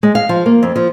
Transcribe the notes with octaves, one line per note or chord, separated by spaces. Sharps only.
G#3
F5
F3
A#3
F2
F3